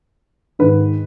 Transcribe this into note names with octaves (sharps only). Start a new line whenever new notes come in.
G#2 D#3 B4